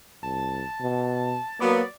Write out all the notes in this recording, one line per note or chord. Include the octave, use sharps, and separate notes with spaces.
C2 A5
B2
F#3 A#3 B3 D5